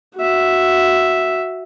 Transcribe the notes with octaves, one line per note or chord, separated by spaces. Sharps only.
F#4 E5